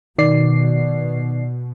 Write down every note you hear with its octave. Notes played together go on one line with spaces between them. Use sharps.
B2 D#3 D5 C7